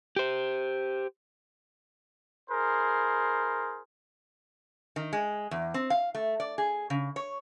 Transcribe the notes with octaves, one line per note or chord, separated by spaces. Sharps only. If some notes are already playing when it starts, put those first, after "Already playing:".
G4 C5
E4 G#4 A#4 C5
D#3
G#3
E2
C4
F5
A3
D5
G#4
C#3
C#5